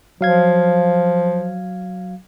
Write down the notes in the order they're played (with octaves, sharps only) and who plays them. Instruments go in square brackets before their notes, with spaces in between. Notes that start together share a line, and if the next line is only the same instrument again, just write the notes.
[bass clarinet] F3 [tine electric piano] F#3 F5 G#6